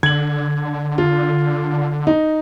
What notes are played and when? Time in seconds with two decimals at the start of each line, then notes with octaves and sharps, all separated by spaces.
0.03 D3 G#6 F#7
0.98 F4
2.07 D#4